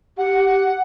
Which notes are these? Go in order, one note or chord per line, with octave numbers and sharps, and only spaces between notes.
G4 F#5